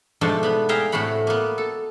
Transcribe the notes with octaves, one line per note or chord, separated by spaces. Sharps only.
G#2 B2 F3 A3 D4
B3 B5
G#4 E5 F5 G5 A#5
A2 C3 A3 F#4 B5
A#3 B3
A4